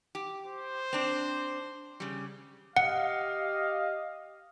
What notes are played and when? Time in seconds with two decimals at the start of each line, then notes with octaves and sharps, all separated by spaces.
0.15 G4
0.46 C5
0.93 C4 D4
2.00 C#3 G3
2.77 G4 D#5 F5 F#5